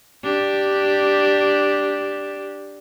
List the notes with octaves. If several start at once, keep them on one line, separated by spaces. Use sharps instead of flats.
D4 G4